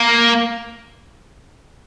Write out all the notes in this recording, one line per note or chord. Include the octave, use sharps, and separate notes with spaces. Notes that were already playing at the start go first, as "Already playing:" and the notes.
Already playing: A#3